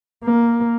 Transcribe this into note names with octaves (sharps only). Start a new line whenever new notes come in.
A#3